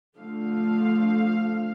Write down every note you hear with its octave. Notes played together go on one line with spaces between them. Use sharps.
D3 F3 A3 F5